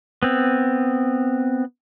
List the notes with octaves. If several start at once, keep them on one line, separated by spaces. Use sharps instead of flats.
B3 C4